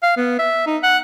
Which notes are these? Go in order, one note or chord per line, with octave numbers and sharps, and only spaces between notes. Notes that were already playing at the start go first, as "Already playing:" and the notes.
F5
B3
E5
D#4
F#5